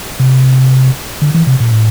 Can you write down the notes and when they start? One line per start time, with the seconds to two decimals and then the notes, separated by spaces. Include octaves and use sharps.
0.20 C3
1.22 D3
1.34 E3
1.47 C3
1.60 A#2
1.72 A2